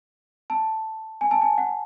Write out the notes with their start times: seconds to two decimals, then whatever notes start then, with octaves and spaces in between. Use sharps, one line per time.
0.50 A5
1.21 G#5
1.31 A5
1.42 G#5
1.58 F#5